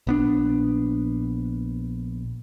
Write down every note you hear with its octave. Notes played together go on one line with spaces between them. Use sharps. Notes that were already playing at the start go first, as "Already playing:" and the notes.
A#1 B3 D4